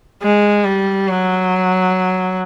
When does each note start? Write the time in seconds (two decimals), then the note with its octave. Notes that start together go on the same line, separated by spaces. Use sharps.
0.23 G#3
0.65 G3
1.08 F#3